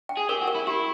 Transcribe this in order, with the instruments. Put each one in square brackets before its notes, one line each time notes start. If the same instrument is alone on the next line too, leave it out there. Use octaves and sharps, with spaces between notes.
[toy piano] G5
[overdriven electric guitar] G#4
[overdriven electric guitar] G4 [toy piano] A#4
[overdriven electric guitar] F#4
[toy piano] A#4
[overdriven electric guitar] E4
[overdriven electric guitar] E4 [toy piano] G4